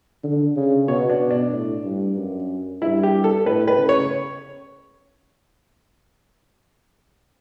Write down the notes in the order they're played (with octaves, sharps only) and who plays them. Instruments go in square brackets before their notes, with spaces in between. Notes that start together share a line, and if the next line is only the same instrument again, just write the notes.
[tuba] D3
C#3
[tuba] B2 [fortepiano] C#5
[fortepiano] D4
D4
[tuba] A2
G2
F#2
[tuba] G2 [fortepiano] E4
[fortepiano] G4
A4
[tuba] A2 [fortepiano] B4
[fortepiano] B4
[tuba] C#3
[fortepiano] C#5